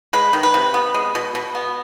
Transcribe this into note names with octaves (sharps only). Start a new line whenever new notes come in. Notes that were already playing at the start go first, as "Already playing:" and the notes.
G#3 B4
D#3
B4
C3
B3
G#3
B2
B2
B3